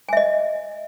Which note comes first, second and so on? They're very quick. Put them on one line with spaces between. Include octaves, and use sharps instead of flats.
G#5 E5 D#5